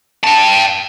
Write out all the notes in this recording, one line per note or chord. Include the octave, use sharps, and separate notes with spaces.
G5 A5